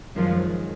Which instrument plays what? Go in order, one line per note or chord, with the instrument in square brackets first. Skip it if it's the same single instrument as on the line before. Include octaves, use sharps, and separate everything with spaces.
[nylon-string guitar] F#2 D#3 G#3 [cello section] F3